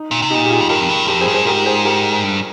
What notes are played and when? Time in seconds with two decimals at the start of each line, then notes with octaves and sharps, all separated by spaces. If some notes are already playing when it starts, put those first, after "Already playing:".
Already playing: D#4
0.11 A#2
0.22 C3
0.30 A#2 D#4 G4
0.45 G4
0.50 F4 G#4
0.61 F2
0.69 G2 G4 A#4
0.80 F2
0.89 G2
1.08 F2 G4 A#4
1.20 G#4 C5
1.28 G2
1.33 G#4 C5
1.46 G#2 G4 A#4
1.65 G#4 C5
1.85 G4 A#4
2.24 G2